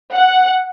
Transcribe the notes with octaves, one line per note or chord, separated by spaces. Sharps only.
F#5